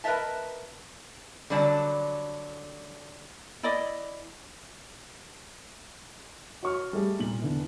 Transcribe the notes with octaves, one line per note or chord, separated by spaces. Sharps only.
A#4 B4 C#5 D#5 E5 A5
D3 F#3 G3 D5 A5
E4 D5 D#5
F#4 C#5 C#6 F6
G3 A3 G#4
A#2 F#7
E2 D3 E3